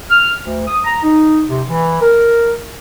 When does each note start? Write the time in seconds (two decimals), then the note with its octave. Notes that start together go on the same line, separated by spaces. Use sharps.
0.10 F6
0.42 D2
0.68 D#6
0.84 A#5
1.03 D#4
1.49 C3
1.68 E3
2.01 A#4